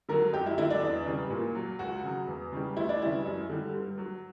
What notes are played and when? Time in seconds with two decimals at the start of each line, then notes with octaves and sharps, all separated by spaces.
0.09 D3 F#3 A#4
0.33 F#2 G4
0.46 E4
0.58 D3 F#3 E4
0.70 D4
0.82 E2
1.06 C#3 E3 G3
1.30 A#2
1.55 F#3
1.79 C#2 F#4
2.04 C#3 F#3
2.27 E2
2.52 C#3 E3 G3
2.77 D2 E4
2.89 D4
3.01 C#3 E3 G3 E4
3.25 F#2
3.49 D3 G3
3.74 G2
3.98 F#3